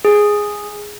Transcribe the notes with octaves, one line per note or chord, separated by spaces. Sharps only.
G#4